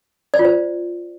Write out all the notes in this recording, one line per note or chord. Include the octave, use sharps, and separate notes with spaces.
D5
F4
C5